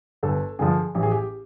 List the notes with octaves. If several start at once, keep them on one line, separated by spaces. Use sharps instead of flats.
G1 A4
G2 D3 F3 G#4
A1 G4
G#4
G4